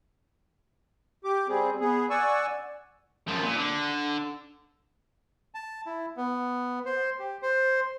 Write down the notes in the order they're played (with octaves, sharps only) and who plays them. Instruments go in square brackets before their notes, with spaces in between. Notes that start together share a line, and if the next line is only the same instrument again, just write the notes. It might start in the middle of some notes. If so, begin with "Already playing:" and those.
[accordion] G4 D6
G3 C4 G#4
B3 G#4
D5 F#5 G#5 C#6 E6
[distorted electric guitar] F#2 F3
A#2
D3
[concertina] A5
E4
B3
C5
G4
C5